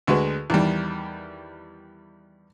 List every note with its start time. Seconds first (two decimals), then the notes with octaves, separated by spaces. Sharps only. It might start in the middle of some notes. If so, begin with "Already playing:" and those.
0.07 D2 G#3 F#4 B4
0.50 E2 D#3 G3